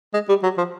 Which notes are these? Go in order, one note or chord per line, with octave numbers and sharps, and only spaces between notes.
G#3
G3
F#3
F3